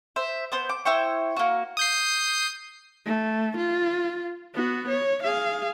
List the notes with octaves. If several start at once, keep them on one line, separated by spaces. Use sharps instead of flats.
C5 E5
B3 C5 G6
D6
E4 C5 G5 C#6
A#3 F#4
D#6 G6 C7
A3
F4
B3 F#4
C#5
G#4 F5